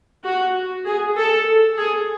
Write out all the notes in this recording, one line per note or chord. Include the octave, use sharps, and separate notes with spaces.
F#4
G#4
A4
G#4